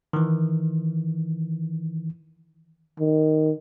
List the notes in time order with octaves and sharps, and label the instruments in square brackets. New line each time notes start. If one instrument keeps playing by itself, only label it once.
[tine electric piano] D#3 E3
[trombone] D#3